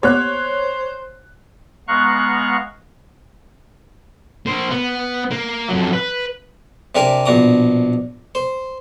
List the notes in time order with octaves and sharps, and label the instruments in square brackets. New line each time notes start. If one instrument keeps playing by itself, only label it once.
[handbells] A#3 B3 G4 [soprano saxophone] C5 [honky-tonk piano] C#5 F#6
[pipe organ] G#3 B3 F5 A#5 C#6 F#6
[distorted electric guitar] A#3 C5
B3
A#3
F2 F#3
B4
[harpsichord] C3 D4 G4 A#4 G#5
A#1 B2 D4 A#5 D6
C5